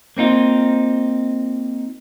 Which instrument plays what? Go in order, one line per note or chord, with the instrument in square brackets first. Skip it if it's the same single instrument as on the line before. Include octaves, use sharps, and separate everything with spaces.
[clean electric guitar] A#3 C4 D#4 F4